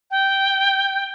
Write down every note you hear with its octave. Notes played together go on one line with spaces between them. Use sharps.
G5